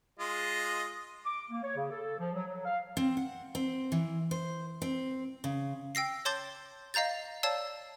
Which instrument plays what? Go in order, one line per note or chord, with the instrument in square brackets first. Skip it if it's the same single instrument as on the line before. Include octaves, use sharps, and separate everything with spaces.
[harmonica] G#3 F4 D#5
[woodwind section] D6
A#3
C#5
C#3
A4
F3
F#3
F#3
F5
[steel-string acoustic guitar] C4
F#5
C4
E3
C5
C4
C#3
[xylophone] G5 E6 A#6 C7
C#5 A5 C6 D6 G6 A6
D#5 F5 A#5 G6 A6
C#5 D5 F5 A5 E6